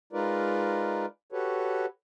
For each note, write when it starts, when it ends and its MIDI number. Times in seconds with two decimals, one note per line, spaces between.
0.13 1.05 56
0.13 1.05 63
0.13 1.05 65
0.13 1.05 70
0.13 1.05 71
0.13 1.05 74
1.32 1.86 66
1.32 1.86 67
1.32 1.86 69
1.32 1.86 71
1.32 1.86 73